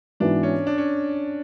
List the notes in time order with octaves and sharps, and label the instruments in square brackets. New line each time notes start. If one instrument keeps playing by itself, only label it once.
[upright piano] G#2 E3 B3 F#4 [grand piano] D4
[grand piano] C#4
D4
C#4